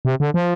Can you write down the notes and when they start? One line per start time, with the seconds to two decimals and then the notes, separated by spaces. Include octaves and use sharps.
0.05 C3
0.20 D3
0.34 F3